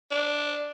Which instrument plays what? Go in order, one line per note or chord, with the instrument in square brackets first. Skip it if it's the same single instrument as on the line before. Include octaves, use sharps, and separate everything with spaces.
[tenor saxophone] D4